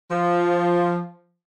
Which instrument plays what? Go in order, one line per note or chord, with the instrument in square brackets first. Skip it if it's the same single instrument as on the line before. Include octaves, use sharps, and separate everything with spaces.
[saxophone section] F3